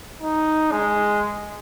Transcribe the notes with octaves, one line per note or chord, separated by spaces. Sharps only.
D#4
G#3